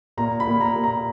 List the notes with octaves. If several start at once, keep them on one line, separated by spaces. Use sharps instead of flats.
A#2 A#5
B5
A#2
A#5
A#2
A#5